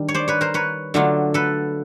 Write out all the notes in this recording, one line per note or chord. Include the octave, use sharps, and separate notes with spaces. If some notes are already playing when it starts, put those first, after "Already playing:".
Already playing: D#3 G3 D4
C#5
C5 D5
B4 C#5
A#4 C5
B4 C#5
D3 F#3 A3 D4 F4
A4 B4